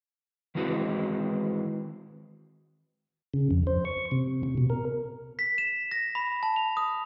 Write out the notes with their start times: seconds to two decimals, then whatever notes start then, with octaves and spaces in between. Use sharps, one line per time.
0.55 D#3 E3 G#3 C4 F#4 B4
3.34 C#3
3.51 F2
3.67 C5
3.85 C#6
4.11 C3
4.43 C3
4.58 B2
4.70 A#4
5.39 B6
5.58 E7
5.91 A#6
6.15 B5
6.43 A5
6.56 F7
6.77 D#6